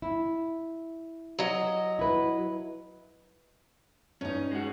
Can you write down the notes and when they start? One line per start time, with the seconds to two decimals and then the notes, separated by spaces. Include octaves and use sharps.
0.02 E4
1.39 F#3 D#5
1.99 E4 B4
4.21 G2 C#4 D#4
4.51 G#3 F#4